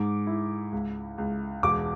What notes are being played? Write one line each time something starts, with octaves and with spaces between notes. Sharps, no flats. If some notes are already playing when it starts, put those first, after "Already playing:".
Already playing: G#2 D6
E4
C#2
C#2
E1 D6